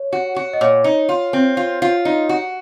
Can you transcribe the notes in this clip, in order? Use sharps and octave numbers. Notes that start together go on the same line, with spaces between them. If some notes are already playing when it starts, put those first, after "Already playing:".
Already playing: C#5
F#4
F#4
D#5
A#2 C#5
D#4
F4
C4
F4
F4
D#4
F#4